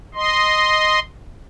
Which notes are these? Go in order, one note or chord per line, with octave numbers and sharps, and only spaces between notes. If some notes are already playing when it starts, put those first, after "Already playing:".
D#5 C6